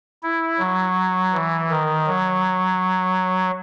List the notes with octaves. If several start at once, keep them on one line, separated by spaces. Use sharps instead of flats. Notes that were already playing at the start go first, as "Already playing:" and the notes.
E4
F#3
E3
D#3
F#3